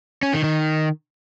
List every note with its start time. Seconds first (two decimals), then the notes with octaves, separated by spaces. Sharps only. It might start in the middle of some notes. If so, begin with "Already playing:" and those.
0.23 C#4
0.33 D#3
0.44 D#3